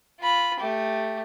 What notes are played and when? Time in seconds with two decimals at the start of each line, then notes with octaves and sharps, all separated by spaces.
0.20 F4 B5
0.59 A3 G4